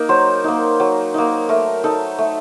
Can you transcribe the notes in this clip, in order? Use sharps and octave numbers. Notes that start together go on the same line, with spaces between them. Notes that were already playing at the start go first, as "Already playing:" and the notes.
Already playing: A#3 D#4 A#4
F#3 C5
A#3 D#4
F#3
A#3 D#4
A3 A#4
D#4 A4
A3